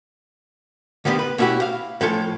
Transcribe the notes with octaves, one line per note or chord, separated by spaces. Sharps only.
D3 D#3 G3 B3 G4
B4
B2 C#4 D4 E4 F#4 G4
F5
A2 F3 C#4 A4